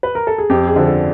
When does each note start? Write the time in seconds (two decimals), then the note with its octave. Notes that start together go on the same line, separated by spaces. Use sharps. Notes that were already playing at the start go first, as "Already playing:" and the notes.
0.03 B4
0.15 A#4
0.27 A4
0.38 G#4
0.50 F2 G4
0.67 G#4
0.76 D3 F3
0.85 A4